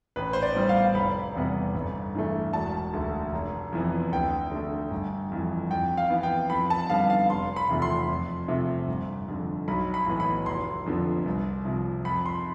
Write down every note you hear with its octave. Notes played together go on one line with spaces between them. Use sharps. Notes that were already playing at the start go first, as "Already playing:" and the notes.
A1 B4
C5
D5
A2 G3 B3
F5
F1 B5
E2 C3 G3 B3
G1
G2 E3 A3
E1 A5
D2 D3 A3
F1
F2 E3 B3
D2 G5
D3 A3
G1
F2 E3
F2 G5
F5
E3 B3
G5
F2 B5
A5
D3 G3 B3 F5
F5
F1 C6
B5
E2 C3 F3 A3
C6
F2
C3 F3 A3
G1
F2 D3
B1 B5
B5
A2 E3 B3
B5
F1 C6
F2 D3 F3 B3
C2
C3 F3
F2 B5
C6